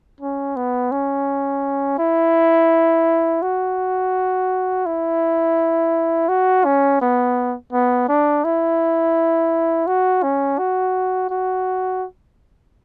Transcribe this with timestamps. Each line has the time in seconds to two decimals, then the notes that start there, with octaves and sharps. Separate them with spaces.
0.21 C#4
0.56 B3
0.91 C#4
1.99 E4
3.42 F#4
4.86 E4
6.28 F#4
6.65 C#4
7.01 B3
7.73 B3
8.08 D4
8.44 E4
9.87 F#4
10.23 C#4
10.58 F#4
11.30 F#4